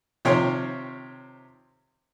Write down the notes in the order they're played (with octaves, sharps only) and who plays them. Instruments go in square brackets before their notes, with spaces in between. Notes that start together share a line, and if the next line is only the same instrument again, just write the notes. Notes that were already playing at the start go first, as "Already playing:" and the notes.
[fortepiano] C3 D#3 F3 C#5 G5 C6